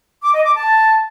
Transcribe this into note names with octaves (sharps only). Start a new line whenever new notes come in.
D6
D#5
D6
A5